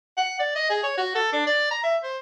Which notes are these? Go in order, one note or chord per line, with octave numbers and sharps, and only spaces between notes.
F#5
D5
D#5
G#4
C#5
F#4
A4
D4
D5
A#5
E5
C5